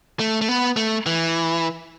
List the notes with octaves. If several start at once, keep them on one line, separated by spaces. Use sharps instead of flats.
A3
A3
B3
A3
E3